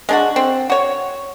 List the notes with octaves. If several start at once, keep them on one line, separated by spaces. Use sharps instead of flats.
G#3 D4 F#4
C4
F#4 C#5